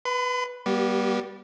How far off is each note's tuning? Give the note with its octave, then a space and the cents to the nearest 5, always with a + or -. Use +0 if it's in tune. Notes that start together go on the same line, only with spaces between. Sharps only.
B4 +0 B5 +45
G3 +0 B3 -45 G4 -35